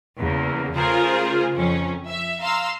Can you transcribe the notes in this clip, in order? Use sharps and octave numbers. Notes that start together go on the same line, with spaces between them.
E2 C#3 A#3
C#3 A3 F4 G#4 A#4 C5
F2 C#4
E5
F5 A#5 C6 E6